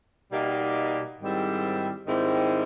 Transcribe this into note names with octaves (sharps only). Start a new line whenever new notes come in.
B2 G3 A#3 D#4 G4
G#2 D#3 G3 C4 E4
G#2 D#3 G3 C4 E4